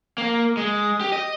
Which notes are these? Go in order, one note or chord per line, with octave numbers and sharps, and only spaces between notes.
A#3
G#3
G4
D#5